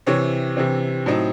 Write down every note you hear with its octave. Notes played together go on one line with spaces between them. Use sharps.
C3 E3 C4 C#5
C3 E3 C4
A2 F#3 C4 D#4